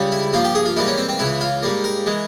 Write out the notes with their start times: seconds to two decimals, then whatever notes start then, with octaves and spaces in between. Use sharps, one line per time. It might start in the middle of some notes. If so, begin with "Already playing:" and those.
Already playing: C#2 C#3 G3
0.12 E4
0.33 G2 F3 A#3 F4
0.44 G4
0.55 G#4
0.65 F4
0.76 G#2 E3 G3 A#3 E4
0.87 C#4
0.98 C4
1.09 C4
1.19 C#2 C#3 E3 E4
1.41 F4
1.63 G#2 G3 A#3
1.84 A#4
2.06 E3 G#3